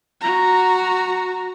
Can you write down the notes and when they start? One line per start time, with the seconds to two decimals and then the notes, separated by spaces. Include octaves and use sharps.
0.21 F#4 A#5